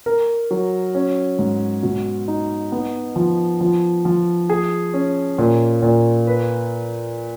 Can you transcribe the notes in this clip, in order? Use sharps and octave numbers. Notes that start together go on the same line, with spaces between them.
A#4
F#3
C#4
G#2
B2
D#4
B3
F3
F3
F3
G#4
C#4
A#2
A#2
B4